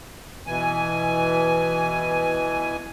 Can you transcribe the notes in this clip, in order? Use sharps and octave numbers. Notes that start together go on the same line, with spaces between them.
B2 E3 G#5